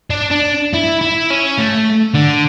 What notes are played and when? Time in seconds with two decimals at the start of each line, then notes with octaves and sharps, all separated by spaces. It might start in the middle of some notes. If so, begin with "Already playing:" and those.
0.10 D4
0.31 D4
0.73 E4
1.01 E4
1.30 C#4
1.58 A3
2.14 D3